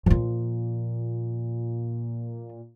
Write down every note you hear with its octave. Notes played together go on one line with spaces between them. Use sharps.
A#2 F3 F4